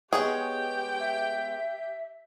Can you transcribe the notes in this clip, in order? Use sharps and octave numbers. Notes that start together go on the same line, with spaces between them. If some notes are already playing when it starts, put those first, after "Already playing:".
G#3 B3 G4 G#4 C#5 G5
E5